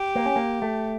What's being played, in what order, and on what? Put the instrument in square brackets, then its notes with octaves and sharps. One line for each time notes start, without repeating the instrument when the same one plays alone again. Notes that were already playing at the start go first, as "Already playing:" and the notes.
Already playing: [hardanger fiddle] G4
[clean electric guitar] A#3
C#4
A#3
A3